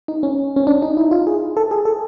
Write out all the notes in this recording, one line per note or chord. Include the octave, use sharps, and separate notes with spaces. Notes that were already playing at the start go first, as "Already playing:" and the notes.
D#4
C#4
C#4
D4
D#4
E4
F4
G#4
A4
G#4
A4